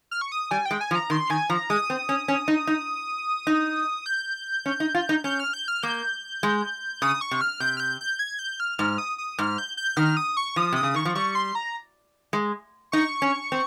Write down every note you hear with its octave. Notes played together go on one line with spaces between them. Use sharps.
F6
C#6
D#6
G3 G#5
G5
G#3
G#5
F3
A#5
D#3 C6
D#3 G#5
F3 A#5
G#3 D#6
C4
C#4
C#4
D#4
D#4
D#4
G6
C#4
D#4
F4
D#4
C#4 G6
F6
G6
F6
A#3 G6
G#3
C#3 D#6
C#6
C3
F6
C3 G6
F6
G6
G6
G#6
G6
F6
G#2 F6
D#6
D#6
G#2 F6
G6
G6
D#3 F6
D#6
C#6
F3 D#6
C3 D#6
C#3
D#3 C#6
F3
G3 C#6
C6
A#5
G#3
D#4 C#6
C#4
C4